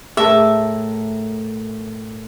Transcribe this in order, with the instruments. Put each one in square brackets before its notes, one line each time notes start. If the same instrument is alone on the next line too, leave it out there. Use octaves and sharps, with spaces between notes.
[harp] A2 A#4 A5 [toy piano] G#4 [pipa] E5